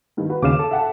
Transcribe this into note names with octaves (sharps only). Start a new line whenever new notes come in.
G2 D#3
F#4 B4
D#2 C#3 F5 D6 E7
A4
E5 F#5 A5